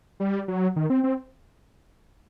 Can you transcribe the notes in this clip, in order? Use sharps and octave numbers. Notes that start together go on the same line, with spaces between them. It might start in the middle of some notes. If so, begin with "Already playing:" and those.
G3
F#3
D#3
C4
C4